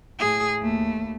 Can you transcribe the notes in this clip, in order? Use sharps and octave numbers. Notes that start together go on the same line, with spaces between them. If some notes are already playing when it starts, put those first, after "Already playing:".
A2 G#4
D#2 A3